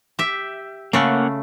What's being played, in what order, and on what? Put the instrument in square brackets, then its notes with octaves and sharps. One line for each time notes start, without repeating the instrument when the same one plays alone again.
[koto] G4 E5
[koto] C#3 A3 [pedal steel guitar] A#3 C#4 F#5